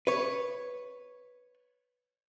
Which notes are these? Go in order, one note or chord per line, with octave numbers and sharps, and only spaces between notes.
B4 C#5